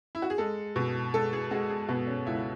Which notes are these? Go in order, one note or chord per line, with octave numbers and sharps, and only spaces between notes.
E4
F#4
G#4
G#3 A4
B2
G#3 A4
G#4
G#3 F#4
G#4
B2 B3
C#4
C#2 E4